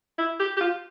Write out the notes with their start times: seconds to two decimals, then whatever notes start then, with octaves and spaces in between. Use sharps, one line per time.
0.19 E4
0.40 G4
0.57 G4
0.61 F4